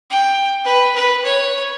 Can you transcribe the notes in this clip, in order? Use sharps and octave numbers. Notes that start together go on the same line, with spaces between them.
G5
B4
B4
C#5